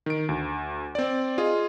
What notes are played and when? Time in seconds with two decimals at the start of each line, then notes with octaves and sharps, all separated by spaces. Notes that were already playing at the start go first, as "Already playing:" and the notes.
0.06 D#3 D7
0.29 D2
0.95 C4 D5
1.38 F4 G#4 D#5 F5